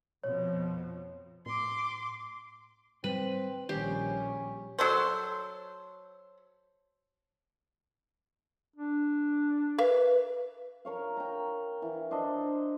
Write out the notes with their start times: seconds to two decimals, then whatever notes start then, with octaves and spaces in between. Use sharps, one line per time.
0.24 F2 B2 F3 C#5
1.46 A2 C6 D6
3.04 G#2 G3 C4 B4
3.69 A#1 D#3 G3 C#4 G4
4.79 F#3 A4 C5
8.76 D4
9.78 A#4 B4 E5 F5
10.85 A#4 C#5 F5
11.17 G5 A#5
11.82 E3
12.11 D4 C5 D#5